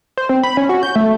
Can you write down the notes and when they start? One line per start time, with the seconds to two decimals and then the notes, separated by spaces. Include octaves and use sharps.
0.17 C5
0.29 C4
0.43 B5
0.57 C#4
0.69 F#4
0.83 G6
0.96 A3